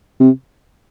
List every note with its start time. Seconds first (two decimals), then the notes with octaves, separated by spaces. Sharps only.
0.20 C3